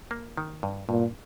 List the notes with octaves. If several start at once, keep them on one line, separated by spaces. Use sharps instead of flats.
A#3
D#3
G2
G2 A#2